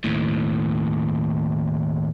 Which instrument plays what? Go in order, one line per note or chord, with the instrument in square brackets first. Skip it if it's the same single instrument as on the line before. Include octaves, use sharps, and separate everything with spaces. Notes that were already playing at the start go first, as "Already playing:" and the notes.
[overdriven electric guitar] D#2 A2